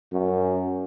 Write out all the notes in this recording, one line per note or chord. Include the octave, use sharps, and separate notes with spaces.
F#2